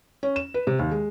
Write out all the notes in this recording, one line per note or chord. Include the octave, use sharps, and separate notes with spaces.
C#4
E7
B4
C3
D#2
G#3